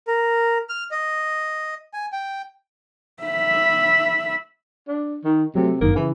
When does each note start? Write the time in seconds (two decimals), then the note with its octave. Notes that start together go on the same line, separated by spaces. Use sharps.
0.07 A#4
0.69 F6
0.91 D#5
1.94 G#5
2.12 G5
3.23 E5 B5
4.88 D4
5.24 D#3
5.55 C3 F#3 A3
5.81 G1 F#2 D#3 A#3
5.96 C#3 E3